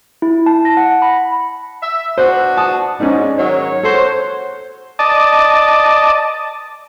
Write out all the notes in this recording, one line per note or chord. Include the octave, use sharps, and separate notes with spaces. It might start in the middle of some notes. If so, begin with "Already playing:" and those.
E4
A5
A#6
F#5
B5
E5
B3 D4 F#4 C5
A5 D#6
G#2 C#4 D#4 D5
G#2 D#3 F#3 C#5
F#4 A4 C5
D5 D#5 A5